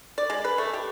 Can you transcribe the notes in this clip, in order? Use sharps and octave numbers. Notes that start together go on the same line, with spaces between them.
D5
G#3
B4
A3
G4